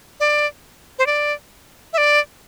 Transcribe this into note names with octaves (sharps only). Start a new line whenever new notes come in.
D5
C5
D5
E5
D5